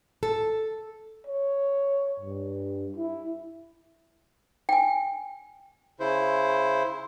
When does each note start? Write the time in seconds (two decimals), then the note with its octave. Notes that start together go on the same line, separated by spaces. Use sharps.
0.23 A4
1.27 C#5
2.20 G2
2.96 E4
4.69 G5 G#5
6.00 C#3 E4 C5